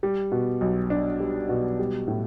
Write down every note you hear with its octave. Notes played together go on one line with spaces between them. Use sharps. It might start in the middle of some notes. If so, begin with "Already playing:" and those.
G3
B2
B1
D4
G3
B2
G3
A2